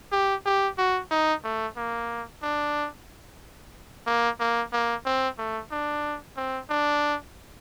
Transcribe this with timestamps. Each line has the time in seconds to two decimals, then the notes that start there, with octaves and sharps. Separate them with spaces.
0.12 G4
0.46 G4
0.78 F#4
1.11 D#4
1.44 A3
1.77 A#3
2.43 D4
4.07 A#3
4.40 A#3
4.73 A#3
5.05 C4
5.38 A3
5.72 D4
6.37 C4
6.70 D4